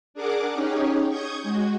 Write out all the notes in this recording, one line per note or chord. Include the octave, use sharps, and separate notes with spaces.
D4 G#4 A#4 F#5 D6
C#4 D#4 G4 G#4 C#5
C#6 D#6 G6 G#6
G#3 F#4